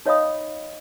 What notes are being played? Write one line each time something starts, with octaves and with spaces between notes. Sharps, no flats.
D#4 C#5 D#5 F5 B5 D#6